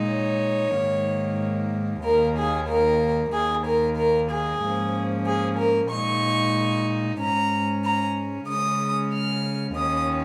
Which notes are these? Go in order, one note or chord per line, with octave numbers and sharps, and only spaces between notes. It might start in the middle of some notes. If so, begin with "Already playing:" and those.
Already playing: A#2 G#3 D#4
C#5
G#2 D#3 A#3
D#2 D#3 A#3 A#4
G#4
A#4
D#2 D#3 A#3 G#4
A#4
A#4
G#4
G#2 F3 A#3 C#4
G#4
A#4
A#2 G#3 D#4 C#6
G#2 G#3 C#4 A#5
A#5
C#3 G#3 C#4 D#6
F6
D#2 D#3 C#4 D#6